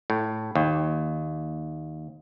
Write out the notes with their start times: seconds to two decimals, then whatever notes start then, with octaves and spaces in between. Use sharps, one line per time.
0.10 A2
0.55 D#2